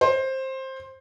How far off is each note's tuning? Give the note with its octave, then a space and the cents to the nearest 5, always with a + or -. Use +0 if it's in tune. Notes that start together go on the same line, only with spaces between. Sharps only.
C5 +15